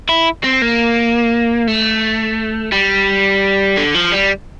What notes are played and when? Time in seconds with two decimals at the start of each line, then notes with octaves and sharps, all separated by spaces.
0.09 E4
0.44 C4
0.62 A#3
1.67 A3
2.72 G3
3.78 D3
3.95 F3
4.13 G3